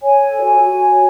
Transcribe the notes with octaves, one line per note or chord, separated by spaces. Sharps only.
C#5 G#5
A4
F#4
F#4
C#5